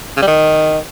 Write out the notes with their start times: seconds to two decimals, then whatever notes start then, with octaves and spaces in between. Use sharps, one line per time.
0.17 C#3
0.22 G3
0.27 D#3